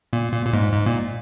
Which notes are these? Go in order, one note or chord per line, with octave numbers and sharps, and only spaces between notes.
A#2
A#2
A#2
G#2
G#2
A#2